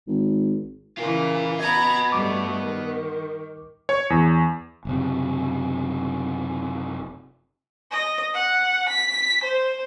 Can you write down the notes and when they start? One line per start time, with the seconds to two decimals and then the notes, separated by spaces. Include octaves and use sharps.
0.07 G#1
0.98 C#3 E3 F4 A#4
1.60 B3 D#5 A#5 B5 G#6
2.12 G2 A3 D6
2.64 D#3
3.89 C#5
4.10 E2
4.85 F#1 C3
7.92 D#5
8.34 F#5
8.89 B6
9.44 C5